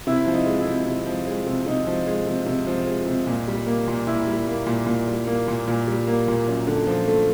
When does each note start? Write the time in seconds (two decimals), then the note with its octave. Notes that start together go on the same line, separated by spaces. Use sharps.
0.07 C3 E4
0.26 F3
0.33 D#4
0.46 G#3
0.60 E4
0.67 C3
0.86 C3
1.06 F3
1.27 G#3
1.46 C3
1.66 C3 D#4
1.87 F3
2.07 G#3
2.27 C3
2.46 C3
2.67 F3
2.87 G#3
3.06 C3
3.27 A#2
3.48 G3
3.67 A#3
3.88 A#2
4.07 A#2 E4
4.27 G3
4.47 A#3
4.66 A#2
4.87 A#2
5.07 G3
5.27 A#3
5.48 A#2
5.68 A#2
5.87 G3
6.07 A#3
6.28 A#2
6.47 F#2
6.67 D3
6.87 F3
7.08 A3